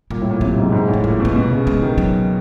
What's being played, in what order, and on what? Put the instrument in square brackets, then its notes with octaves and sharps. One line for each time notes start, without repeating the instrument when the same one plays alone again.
[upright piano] A#2 [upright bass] G3
[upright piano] A2
A#2
[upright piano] C3 [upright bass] F#3
[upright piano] G#2
G#2
A2
[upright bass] F3
[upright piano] A#2 [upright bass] F#3
[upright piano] B2 [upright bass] G3
[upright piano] B2
C#3
[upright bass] G#3
[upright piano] D#3
[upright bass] F#3